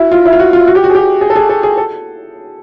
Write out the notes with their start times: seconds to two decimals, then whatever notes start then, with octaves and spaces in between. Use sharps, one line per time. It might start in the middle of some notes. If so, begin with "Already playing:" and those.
Already playing: E4 F#4
0.12 F4
0.25 E4
0.33 F4
0.39 F#4
0.53 F4
0.67 F#4
0.75 G4
0.84 F#4
0.90 G#4
0.95 G4
1.21 G#4
1.30 A4
1.36 G#4
1.49 A4
1.63 G#4
1.77 A4